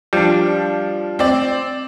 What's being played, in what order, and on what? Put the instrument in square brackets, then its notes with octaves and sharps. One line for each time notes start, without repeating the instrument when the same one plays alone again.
[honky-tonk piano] F3 [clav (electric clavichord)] G3 D4
[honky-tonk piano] C4 D5